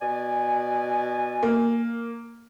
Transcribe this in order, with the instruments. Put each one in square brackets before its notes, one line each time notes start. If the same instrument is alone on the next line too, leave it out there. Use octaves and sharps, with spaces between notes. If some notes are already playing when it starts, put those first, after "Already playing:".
[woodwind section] B2 D5 G#5
[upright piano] A#3